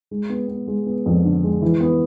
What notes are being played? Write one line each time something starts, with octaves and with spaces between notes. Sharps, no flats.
G#3
B3
B3
G#3
B3
F2
D3
G#3
E3
B3